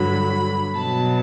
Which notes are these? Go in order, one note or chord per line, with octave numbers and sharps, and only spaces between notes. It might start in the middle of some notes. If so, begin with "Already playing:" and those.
Already playing: G2 D3 F#3 B5
B2 F#3 A5